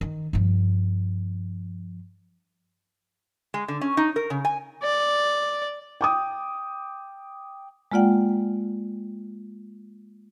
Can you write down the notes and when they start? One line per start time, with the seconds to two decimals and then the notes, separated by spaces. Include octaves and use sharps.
0.01 D#3
0.33 G2 F3
3.54 G#3
3.68 D3
3.81 C#4
3.97 D#4
4.16 A#4
4.30 C#3
4.45 G#5
4.83 D5
6.01 G5 D6 D#6
7.91 G#3 A#3 F4 D5 F#5 G5